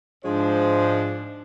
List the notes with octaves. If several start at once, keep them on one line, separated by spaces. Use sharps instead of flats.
G#2 F3 G#3 D4 C5